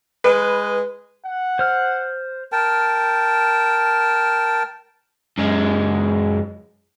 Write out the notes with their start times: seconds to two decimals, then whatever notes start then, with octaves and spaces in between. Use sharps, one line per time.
0.24 G#3 B4
1.26 F#5
1.59 C5 F6
2.52 A#4 G5 A5
5.38 F#2 G#3